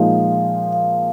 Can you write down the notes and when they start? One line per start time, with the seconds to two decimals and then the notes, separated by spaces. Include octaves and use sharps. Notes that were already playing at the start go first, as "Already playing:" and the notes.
Already playing: A#2 F3 G#3 D#4 F5
0.73 F5